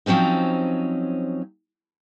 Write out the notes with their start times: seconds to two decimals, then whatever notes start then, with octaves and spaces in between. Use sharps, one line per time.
0.06 F3 F#3 C4 C#4 D#4